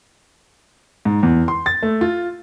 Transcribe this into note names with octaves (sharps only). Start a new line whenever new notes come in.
G#2
E2
C6
A6
A3
F4